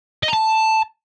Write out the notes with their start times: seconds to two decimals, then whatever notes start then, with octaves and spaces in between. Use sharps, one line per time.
0.23 D#5
0.28 A#5
0.34 A5